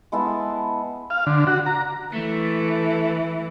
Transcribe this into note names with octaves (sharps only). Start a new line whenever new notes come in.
G#3 B3 E4 A5
F5
D3
F#4
A#5
E3 A3